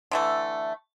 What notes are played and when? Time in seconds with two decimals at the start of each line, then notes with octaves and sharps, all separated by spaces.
0.11 D3 E3 A3